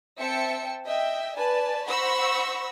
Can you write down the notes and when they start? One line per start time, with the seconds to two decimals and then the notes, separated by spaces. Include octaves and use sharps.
0.20 C4 E5 G5 A5 C#7
0.86 D#5 E5 G5
1.37 B4 D5 G#5 A5
1.88 C5 F#5 B5 C#6 E6 A#6